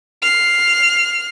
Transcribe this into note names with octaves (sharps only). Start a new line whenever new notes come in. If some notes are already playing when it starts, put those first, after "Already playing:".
F6 C7